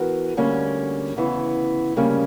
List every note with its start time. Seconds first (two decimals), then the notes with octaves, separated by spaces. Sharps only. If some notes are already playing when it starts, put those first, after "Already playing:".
Already playing: E3 B3 F#4 A#4
0.37 D2 D3 G3 A#3 C#4
1.16 D2 C#3 E3 B3 E4
1.96 D2 C#3 G3 A#3 C#4